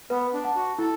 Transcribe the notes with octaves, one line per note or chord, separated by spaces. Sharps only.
B3 B4
D4
F#5 A5
F#4
E4 A4